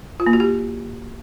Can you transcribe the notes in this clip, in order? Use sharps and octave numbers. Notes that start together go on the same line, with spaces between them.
F4
A#3
F#4
G4